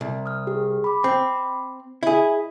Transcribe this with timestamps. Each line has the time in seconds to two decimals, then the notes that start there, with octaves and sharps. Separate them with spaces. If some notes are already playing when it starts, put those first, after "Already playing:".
0.01 C2
0.26 D#6 F6
0.47 G4 G#4
0.84 B5 D6
1.04 C4
2.03 E4 G#4 D#5